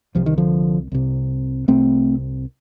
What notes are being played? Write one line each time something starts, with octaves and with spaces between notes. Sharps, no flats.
C2 C3 F3
D#3
D3 F3
C2 C3
C2 C3 A3 C4